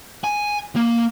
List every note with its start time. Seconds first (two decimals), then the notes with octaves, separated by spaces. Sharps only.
0.24 G#5
0.76 A#3